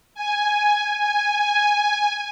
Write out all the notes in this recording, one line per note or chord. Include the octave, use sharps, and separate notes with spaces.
G#5
G#5